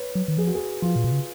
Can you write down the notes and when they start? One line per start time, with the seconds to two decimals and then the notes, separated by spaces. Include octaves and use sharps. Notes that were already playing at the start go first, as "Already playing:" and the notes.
Already playing: B4 C#5
0.15 F#3
0.28 D#3
0.37 F3 G#4
0.47 F#4
0.55 G#4
0.82 F3 F4
0.96 A#2
1.04 B2
1.12 C#3